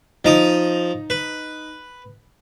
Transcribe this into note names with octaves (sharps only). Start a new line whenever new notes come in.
F3 D#4 A#5 D#6
B4